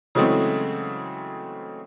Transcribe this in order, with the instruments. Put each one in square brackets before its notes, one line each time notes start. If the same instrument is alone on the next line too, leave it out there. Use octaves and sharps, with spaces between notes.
[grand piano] C#3 E3 F#3 G#3 A3 C4